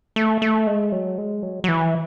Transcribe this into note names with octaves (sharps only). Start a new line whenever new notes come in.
A3
A3
G#3
F#3
G#3
F#3
F#3
E3